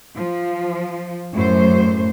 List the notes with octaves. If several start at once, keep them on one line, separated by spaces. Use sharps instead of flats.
F3
F#2 A2 C5